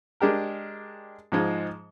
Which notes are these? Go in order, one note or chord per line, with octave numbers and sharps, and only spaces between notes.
G#3 D4 G4 A#4
G#2 F3 G#3